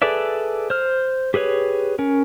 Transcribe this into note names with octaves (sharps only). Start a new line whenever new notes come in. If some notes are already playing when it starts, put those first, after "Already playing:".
G#4 A4 B4 D5 E5
C5 F6
G4 G#4 B4 C#5
C#4 A#4